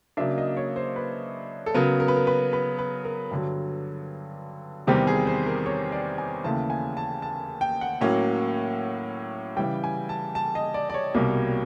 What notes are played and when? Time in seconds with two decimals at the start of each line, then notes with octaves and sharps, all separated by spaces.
0.17 C#3 F#3 A#3 D4 E5
0.38 D#5
0.57 C#5
0.76 C5
0.96 B4
1.66 A4
1.75 C#3 F#3 B3 A#4
2.00 A#4
2.08 B4
2.16 A#4
2.27 B4
2.53 B4
2.79 B4
3.05 A#4
3.31 G2 D3 F#3
4.87 E2 C3 D#3 G3 C4 G4
5.07 G#4
5.27 C5
5.47 A#4
5.66 C#5
5.92 D5
6.18 G#5
6.44 D#2 C#3 E3 A3 A5
6.70 G#5
6.97 A5
7.22 A5
7.61 G5
7.81 F#5
8.01 A2 F#3 A#3 C#4
9.57 C#3 E3 G3 G5
9.84 G#5
10.09 A5
10.35 A5
10.55 D#5
10.74 D5
10.90 D5
10.94 C#5
11.14 C2 B2 G3 A#3